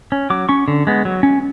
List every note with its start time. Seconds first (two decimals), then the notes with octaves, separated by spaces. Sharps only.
0.12 C#4
0.30 F#3 D6
0.49 C#4 C#6
0.68 D3
0.87 G#3 B3
1.05 F#3
1.23 C#4